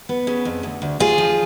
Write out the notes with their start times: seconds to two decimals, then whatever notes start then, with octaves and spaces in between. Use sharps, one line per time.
0.09 B3
0.27 C#3
0.45 F2
0.63 D2
0.82 D2
1.00 D2 F4 G#4
1.18 F3